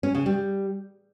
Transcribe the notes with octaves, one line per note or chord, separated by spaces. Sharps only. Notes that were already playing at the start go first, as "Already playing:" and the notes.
C#4
C#3
G3